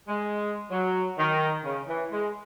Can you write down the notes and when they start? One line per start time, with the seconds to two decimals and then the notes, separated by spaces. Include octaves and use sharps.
0.08 G#3
0.70 F#3
1.18 D#3
1.64 C#3
1.87 E3
2.10 G#3